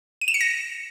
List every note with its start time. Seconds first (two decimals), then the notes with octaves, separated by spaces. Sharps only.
0.21 D#7
0.28 E7
0.34 C#7
0.41 A#6